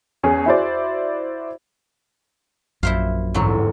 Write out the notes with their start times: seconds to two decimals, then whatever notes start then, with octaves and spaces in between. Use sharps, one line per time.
0.23 E2 C#4 G#4
0.46 E4 F#4 C5 D5
2.83 A#1 F#2 E4 C5 F5
3.34 G1 E2 G#2 F#3 C4